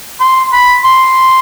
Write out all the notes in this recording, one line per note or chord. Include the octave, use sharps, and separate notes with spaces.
C6
B5
C6